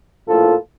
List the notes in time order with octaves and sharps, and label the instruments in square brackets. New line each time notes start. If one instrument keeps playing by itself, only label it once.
[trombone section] A#1 A2 F3 A#3 F4 A4